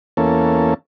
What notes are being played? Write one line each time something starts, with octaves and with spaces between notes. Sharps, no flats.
E2 A#3 C#4 A4